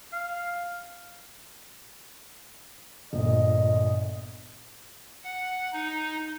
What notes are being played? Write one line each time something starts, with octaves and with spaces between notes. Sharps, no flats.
F5
G1 A#2 D#5
F#5
D#4